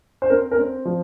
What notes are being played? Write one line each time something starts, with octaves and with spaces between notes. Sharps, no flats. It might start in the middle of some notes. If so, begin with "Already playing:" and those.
C5
C4 A#4
A#4
C4
F3